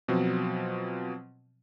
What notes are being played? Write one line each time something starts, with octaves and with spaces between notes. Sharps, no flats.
B2 F3 F#3 C4